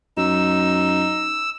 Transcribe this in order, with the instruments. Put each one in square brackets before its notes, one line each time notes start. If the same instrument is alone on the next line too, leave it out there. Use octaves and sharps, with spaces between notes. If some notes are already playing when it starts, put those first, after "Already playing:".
[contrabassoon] F#2 [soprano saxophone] D#4 [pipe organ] E6